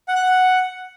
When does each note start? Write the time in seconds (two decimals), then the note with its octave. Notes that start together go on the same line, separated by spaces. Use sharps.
0.08 F#5
0.15 F#6
0.23 F#5